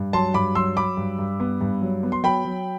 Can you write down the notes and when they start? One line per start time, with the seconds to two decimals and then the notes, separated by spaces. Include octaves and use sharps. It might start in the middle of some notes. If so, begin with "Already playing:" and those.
Already playing: G2
0.13 F#3 A5 C6
0.34 G2 B5 D6
0.55 F#3 C6 E6
0.77 F#3 B5 D6
0.97 G2
1.19 G2
1.40 B3
1.61 G2
1.82 F#3
2.03 B3
2.12 C6
2.23 F#3 G5 B5
2.45 F#3